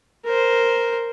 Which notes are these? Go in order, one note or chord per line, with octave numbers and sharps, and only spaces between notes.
A#4 C5